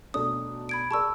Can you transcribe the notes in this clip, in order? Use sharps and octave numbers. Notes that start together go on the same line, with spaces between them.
B1 A3 D4 D#6
B5 G#6 D7
G#4 A#4 D5 A5 C#6 E6